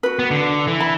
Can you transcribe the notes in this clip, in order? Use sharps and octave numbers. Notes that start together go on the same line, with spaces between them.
F#4 B4
B3
D3
E3
B5